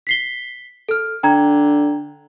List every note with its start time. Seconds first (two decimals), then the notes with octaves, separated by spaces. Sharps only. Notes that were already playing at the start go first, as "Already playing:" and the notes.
0.07 B6 C7 G7
0.89 A4 F6
1.23 D3 G5 A#5 G#6